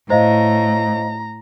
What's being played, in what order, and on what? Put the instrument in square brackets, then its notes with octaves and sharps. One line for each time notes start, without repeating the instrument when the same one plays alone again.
[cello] A2 [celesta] C5 D#5 F5 [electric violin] A#5